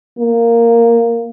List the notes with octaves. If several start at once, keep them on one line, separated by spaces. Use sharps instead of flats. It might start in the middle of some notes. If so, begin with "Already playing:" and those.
A#3